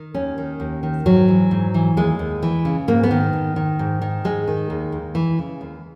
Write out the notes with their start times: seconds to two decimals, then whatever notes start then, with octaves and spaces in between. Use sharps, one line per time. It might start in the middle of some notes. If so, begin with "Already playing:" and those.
Already playing: D#3
0.14 D#2 C#4
0.38 D#3
0.60 D#2
0.83 D#3
1.06 G#2 F#3
1.28 E3
1.51 G#2
1.74 E3
1.97 D#2 G#3
2.19 D#2
2.42 E3
2.65 C#3
2.88 G#2 A#3
3.03 B3
3.11 D#3
3.33 G#2
3.56 D#3
3.79 G#2
4.02 D#3
4.24 G#2 G#3
4.47 D#3
4.70 D#2
4.92 D#2
5.15 E3
5.39 C#3
5.61 D#2